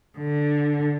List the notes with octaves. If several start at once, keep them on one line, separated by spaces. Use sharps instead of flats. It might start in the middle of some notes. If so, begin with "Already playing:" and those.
D3